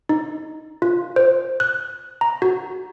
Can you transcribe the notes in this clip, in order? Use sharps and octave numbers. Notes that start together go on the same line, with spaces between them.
D#4
F4
C5
F#6
A#5
F#4